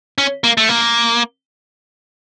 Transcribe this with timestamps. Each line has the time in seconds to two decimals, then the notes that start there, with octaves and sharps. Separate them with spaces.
0.18 C#4
0.44 A#3
0.57 A3
0.69 A#3